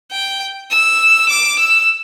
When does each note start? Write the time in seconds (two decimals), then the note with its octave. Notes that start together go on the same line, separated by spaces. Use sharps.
0.11 G5
0.71 E6
1.29 D6
1.59 E6